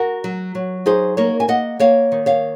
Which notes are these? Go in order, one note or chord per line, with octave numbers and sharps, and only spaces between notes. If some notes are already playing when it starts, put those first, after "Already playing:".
Already playing: F#4 A#4
F#3
F#3
D#4 G#4 C5
A#3 A#4 C#5
G#5
A#3 D#5 F#5
A#3 C#5 F5
D#3
C#5 F5